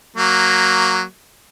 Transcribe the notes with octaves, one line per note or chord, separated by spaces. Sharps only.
F#3 A#3